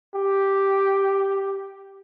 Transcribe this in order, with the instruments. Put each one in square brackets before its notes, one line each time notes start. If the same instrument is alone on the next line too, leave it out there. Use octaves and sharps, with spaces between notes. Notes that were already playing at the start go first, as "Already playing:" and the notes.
[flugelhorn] G4